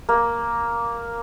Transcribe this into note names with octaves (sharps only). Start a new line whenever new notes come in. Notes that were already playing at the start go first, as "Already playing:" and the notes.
A#3